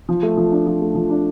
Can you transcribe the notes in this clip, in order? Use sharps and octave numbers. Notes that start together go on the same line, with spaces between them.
F3
A3
F3
D4
F3
A3
F3
D4